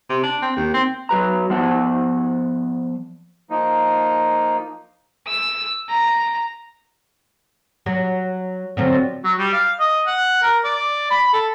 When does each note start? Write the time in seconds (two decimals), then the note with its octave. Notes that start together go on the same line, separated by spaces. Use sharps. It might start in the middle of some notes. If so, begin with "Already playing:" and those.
0.10 C3
0.23 D4
0.42 C4
0.56 D#2
0.74 C4
1.09 F#3 B4 A#5
1.50 F3 B3 C5 D5 F#5 A5
3.50 F3 A#3 D#4
5.28 E6
5.89 A#5
7.86 F#3
8.77 D3 F3 F#3 C4
9.24 F#3
9.38 G3
9.53 F5
9.80 D#5
10.07 F#5
10.42 A#4
10.64 D5
11.11 B5
11.33 A4